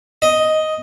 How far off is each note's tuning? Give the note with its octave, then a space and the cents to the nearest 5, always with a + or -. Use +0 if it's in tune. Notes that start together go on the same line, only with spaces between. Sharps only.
D#5 +5